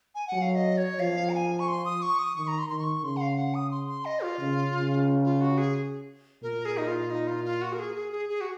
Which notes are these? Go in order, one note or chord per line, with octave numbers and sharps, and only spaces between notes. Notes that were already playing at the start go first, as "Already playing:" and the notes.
G#5
F#3 F#5
F5
D#5
C#5
F3 F5
A#5
G#5
C#6
C6
D#6
C#6
D#6
D#3 C#6
A#5
C6
D#3 C6
C#6
C#3 C6
F#5
F5
F#5
D#6
C6
C6
D#5
F4
C#3
C#3
F4
F#4
G#4
A#2 A#4
G#4
D#4
F4
D#4
F4
F4
F#4
A#4
G#4
G#4
G#4
G#4
F#4